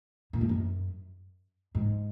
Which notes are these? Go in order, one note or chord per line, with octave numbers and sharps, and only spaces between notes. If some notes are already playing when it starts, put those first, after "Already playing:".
A#2
G#2
F#2
G#2